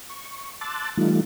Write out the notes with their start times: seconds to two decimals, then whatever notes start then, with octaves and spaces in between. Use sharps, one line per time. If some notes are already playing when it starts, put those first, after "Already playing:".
0.09 C#6
0.61 A5 C6 D6 E6 F#6 A6
0.97 E3 G3 A3 D#4 F4